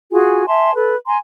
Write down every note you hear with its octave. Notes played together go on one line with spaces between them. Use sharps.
F4 F#4 G#4 G#5
E5 G#5 A5 C6
A4 B4
G#5 A#5 C6